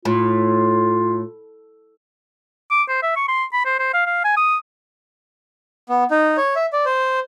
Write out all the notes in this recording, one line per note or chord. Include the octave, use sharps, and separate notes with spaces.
A2 F4
D6
C5
E5
C#6
C6
B5
C5
C5
F5
F5
G#5
D#6
B3
D#4
C#5
E5
D5
C5